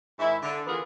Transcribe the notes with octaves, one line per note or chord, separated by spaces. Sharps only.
G#2 D#3 E4
D3
E3 B3 F4 G#4 A#4